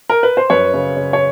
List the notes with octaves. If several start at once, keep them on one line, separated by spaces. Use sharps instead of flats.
A#4
B4
C5
F#2 B4 C#5
C#3
C#3
C#5